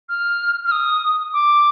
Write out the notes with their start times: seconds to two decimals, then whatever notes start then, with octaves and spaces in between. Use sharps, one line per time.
0.09 F6
0.66 F6
0.72 D#6
1.33 D6